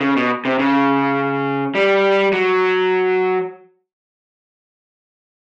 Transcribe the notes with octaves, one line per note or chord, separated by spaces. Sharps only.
C#3
B2
C3
C#3
G3
F#3